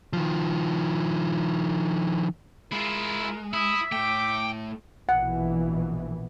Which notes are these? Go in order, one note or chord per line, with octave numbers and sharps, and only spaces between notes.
D#3 F3
G#3 E4 F4 A#4
E4 E5 D#6
A2 A3 G5 D6
A#1 B2 E3 F#5